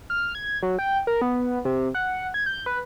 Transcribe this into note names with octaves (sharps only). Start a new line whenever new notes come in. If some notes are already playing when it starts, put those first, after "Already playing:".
F6
G#6
F#3
G5
A#4
B3
C3
F#5
G#6
G6
B4